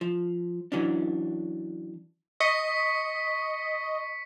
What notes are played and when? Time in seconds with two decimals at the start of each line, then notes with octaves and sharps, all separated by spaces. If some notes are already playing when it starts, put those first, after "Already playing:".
0.01 F3
0.72 E3 F#3 C#4 D4
2.40 D#5 C#6 B6 C#7